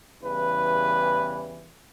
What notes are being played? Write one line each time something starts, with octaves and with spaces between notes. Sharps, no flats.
E2 C#3 E3 G3 B4